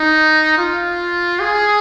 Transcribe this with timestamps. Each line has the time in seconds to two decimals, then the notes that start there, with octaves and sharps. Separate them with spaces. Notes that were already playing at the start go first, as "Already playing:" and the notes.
Already playing: D#4
0.58 F4
1.40 G#4